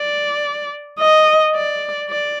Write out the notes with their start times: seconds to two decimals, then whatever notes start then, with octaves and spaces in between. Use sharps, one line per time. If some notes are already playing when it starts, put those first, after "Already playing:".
Already playing: D5
0.99 D#5
1.55 D5
2.09 D5